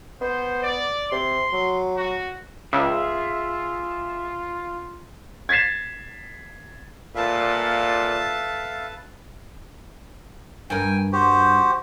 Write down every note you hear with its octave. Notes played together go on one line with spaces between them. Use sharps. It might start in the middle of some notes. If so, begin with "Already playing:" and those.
B3 C5
D5
C3 C6
F#3
F#4
C#2 F4 G#4 E5
G#6 A6 B6 C7 E7
A#2 A4 B4 E5 F5 A5
G2 A#4 G5 G#5
F#4 G4 C5